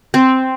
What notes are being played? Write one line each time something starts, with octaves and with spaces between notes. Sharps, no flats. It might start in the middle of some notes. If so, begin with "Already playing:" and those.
C4